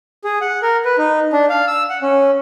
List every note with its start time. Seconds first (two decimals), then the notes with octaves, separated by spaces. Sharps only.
0.24 G#4
0.41 F#5
0.62 A#4
0.85 B4
0.98 D#4
1.33 D4
1.49 F5
1.67 E6
1.90 F#5
2.02 C#4